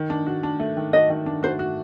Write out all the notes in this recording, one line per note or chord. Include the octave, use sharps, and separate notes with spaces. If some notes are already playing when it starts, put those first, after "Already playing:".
Already playing: D#3
D4
F#4
D4
A3
D#3
F#4 D#5
D#3
D4
F#4 C5
F#4